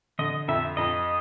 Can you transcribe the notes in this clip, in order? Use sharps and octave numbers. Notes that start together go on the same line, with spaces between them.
D3 D#5
F2 E5
F2 D#5